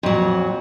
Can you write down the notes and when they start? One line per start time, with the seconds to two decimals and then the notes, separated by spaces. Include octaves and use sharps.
0.03 F2
0.06 F#3
0.09 A#2